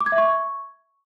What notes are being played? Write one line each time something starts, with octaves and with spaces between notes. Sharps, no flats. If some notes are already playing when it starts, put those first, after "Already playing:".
D6
G#6
E5
C#6